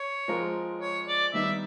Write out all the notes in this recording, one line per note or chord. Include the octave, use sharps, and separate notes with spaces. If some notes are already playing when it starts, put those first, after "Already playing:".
Already playing: C#5
F3 G#3 C4 F4 A#4
C#5
D5
D#3 G3 B3 D#4 E5